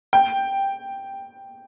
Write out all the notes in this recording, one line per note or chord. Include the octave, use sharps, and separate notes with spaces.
G5